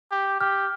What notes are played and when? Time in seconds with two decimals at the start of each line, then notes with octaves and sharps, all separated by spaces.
0.11 G4
0.41 G4 F6